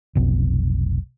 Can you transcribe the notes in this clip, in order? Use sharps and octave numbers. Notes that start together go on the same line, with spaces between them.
F1 B1